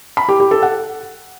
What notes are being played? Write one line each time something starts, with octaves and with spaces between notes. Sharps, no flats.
B5
G4
G4
A4
F#5